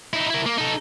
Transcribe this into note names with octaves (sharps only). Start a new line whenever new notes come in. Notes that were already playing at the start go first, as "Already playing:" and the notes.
D#4 E4
E4 A#4
A#3
D#4 A4